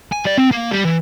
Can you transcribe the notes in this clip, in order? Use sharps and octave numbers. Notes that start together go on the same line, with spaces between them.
G#5
G3 D5
C4
A#3
G3
E3